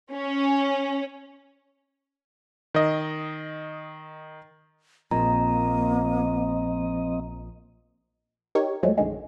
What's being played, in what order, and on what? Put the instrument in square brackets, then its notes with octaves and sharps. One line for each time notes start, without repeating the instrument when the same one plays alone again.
[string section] C#4
[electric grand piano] D#3 D#5
[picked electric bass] A#1 A#2 [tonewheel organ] F3 C4 D#5 [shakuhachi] A#3 [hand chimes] A#5
[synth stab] D#4 G4 A#4 C#5
E2 F3 F#3 G#3 A3
A#1 F#2 D3 D#3 G#3